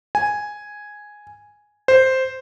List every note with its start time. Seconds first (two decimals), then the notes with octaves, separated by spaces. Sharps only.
0.15 G#5
1.88 C5